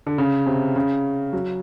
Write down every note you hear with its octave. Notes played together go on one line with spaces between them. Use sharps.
D3
C#3
C3
C#3
F#3